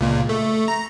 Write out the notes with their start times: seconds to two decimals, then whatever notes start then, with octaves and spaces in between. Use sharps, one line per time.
0.01 C#2 A#2
0.29 A3
0.68 A#5